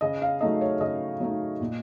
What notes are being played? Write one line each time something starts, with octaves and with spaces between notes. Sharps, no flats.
C#3 D#5
F5
F#3 A3 D#4 D#5
C#5
C#3 D#5
F#3 A3 D#4
A#2